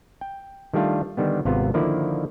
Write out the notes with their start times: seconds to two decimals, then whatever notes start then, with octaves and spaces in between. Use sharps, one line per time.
0.21 G5
0.74 D#3 G3 A3 D4 F4
1.17 D3 D#3 G3 B3
1.45 G#1 C3 B3 F4
1.74 D3 D#3 F3 A#3 E4 D5